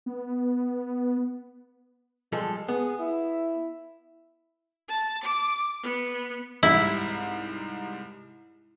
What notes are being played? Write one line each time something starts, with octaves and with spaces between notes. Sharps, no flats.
B3
F3 G3 G#3 A4
B3 G#4
E4
A5
D6
B3
C2 G#2 G3 E4